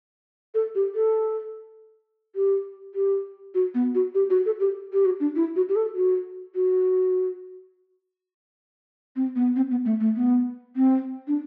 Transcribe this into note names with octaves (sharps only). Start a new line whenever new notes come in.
A4
G4
A4
G4
G4
F#4
B3
F#4
G4
F#4
A4
G4
G4
F#4
D4
E4
F#4
G4
A4
F#4
F#4
C4
B3
C4
B3
A3
A3
B3
C4
D4